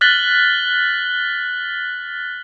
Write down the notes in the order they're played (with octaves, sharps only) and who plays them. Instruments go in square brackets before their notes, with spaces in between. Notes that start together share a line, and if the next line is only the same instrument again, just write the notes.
[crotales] F6 F#6 A6 B6 F#7 G7